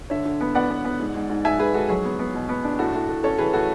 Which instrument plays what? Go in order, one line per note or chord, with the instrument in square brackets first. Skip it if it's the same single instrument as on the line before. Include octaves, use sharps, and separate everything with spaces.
[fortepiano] D3 [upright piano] C#5 E5
[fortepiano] D3
B3
[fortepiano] B3 [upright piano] D5 F#5
[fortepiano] B3
B3
G#2
G#2
G#2
[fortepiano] G#2 [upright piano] E5 G#5
[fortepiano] G#2 [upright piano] G#4 B4
[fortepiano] G#2 [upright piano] F#4 A4
[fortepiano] F#3 [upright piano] G#4
[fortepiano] B3
B3
B2
B3
D4
[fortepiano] A2 [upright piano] F#4 A4
[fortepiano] A2
A3
[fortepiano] C#4 [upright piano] A4 C#5
[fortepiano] E3 [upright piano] G#4 B4
[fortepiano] A2 [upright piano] F#4 A4